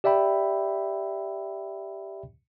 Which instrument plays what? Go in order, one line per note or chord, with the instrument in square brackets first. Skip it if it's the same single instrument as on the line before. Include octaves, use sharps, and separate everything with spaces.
[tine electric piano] G4 D5 E5 G5 B5